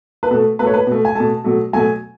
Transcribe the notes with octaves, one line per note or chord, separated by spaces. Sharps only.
B4
B2 A3 A4
B2 A3 B4
C#5
B4
B2 A3
G#5
B2 A3 A5
B2 F#3 A3
B2 F#3 A3 G#5